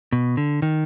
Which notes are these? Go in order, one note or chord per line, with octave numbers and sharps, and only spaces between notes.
B2
D3
D#3